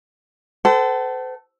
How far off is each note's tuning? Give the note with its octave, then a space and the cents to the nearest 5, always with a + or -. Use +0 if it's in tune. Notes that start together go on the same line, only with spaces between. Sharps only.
A4 +0 C5 -40 F#5 +45